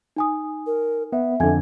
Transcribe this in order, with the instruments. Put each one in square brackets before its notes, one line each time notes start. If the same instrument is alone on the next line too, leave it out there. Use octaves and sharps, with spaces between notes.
[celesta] D#4 G#5 D#6
[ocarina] A#4
[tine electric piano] B3 [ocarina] E5
[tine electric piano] F2 D3 [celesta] G#5 G#6